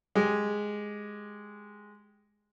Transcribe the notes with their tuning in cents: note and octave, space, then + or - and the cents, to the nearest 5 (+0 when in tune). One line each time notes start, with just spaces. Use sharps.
G#3 +0 G4 +0